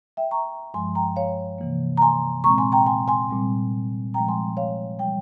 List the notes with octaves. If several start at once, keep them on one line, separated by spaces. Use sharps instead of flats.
E5 G5
A#5 C#6
G2 F3 G#3 G#5 C6
G5 A#5
C#5 F5
C3 E3 A#3
A#5
G#5 C6
A#2 G#3 C4 A#5 C#6
G#5 C6
G5 A#5
G#5 C6
G#5 C6
A#2 G3 C4
A#2 F3 G#3 G5 A#5
G#5 C6
C#5 F5
E3 G3 G5